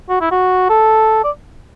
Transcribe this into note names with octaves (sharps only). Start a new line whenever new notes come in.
F#4
E4
F#4
A4
D5